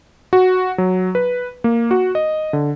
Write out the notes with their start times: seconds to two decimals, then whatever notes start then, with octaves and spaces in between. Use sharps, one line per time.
0.33 F#4
0.78 F#3
1.15 B4
1.64 A#3
1.91 F#4
2.15 D#5
2.53 D3